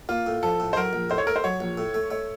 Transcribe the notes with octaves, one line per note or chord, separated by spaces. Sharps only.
A#3 F4
A2
F3 A4
A2
C5
F#3 A#4
A#1
A2 C5
C#5
A3 A#4
C5
F#3 C#5
A#1
A2
A3
A3 C#5